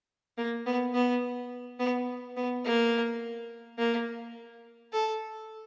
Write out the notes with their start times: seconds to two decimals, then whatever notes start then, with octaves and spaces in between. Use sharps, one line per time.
0.38 A#3
0.66 B3
0.94 B3
1.79 B3
2.37 B3
2.65 A#3
3.78 A#3
4.93 A4